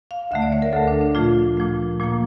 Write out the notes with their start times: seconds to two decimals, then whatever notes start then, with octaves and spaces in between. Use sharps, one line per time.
0.11 F5
0.31 D2 D3 A3 E5
0.42 D5
0.52 C#5
0.62 A#4
0.73 D2 D3 A3 A4
0.88 D4
1.01 D4
1.15 A#2 F3 A3 F4
1.57 A#2 F3 A3
2.00 A#2 F3 A#3